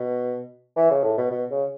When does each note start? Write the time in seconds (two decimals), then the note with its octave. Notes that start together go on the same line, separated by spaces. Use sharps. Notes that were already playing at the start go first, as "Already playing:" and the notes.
Already playing: B2
0.76 E3
0.91 C#3
1.04 A2
1.18 B2
1.31 B2
1.51 C#3